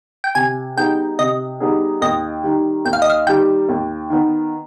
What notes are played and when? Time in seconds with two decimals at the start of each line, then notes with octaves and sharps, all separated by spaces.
0.24 G5
0.35 C3 G#5
0.77 G3 B3 D#4 G#4 G5
1.19 C3 D#5
1.60 G3 B3 D#4 G#4
2.02 D#2 D#5
2.44 D#3 G3
2.85 D#2 G5
2.93 F5
3.02 D#5
3.10 F5
3.27 D#3 G3 G5
3.69 D#2
4.10 D#3 B3